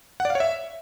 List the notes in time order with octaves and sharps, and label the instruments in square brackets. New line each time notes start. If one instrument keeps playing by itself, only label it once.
[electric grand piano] F#5
D5
F5
C#5
E5